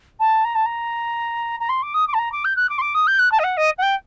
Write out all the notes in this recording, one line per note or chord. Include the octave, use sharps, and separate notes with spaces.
A5
A#5
A5
A#5
A#5
C6
D6
D#6
D6
A5
A#5
D6
G6
F#6
D6
C6
D6
D#6
G6
F#6
A5
D#5
F#5
D#5
F#5
G5